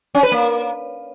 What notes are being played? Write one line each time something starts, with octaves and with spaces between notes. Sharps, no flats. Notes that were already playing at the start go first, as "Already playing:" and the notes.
C#4
B4
A#3